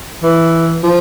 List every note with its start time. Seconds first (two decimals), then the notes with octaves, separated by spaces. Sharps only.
0.23 E3
0.83 F3